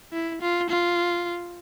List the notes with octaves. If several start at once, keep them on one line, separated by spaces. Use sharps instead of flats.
E4
F4
F4